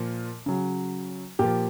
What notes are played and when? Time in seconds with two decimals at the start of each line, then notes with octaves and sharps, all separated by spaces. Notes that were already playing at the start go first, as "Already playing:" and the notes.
Already playing: A#2 F3
0.46 C#3 F#3
1.39 A#2 F3 G4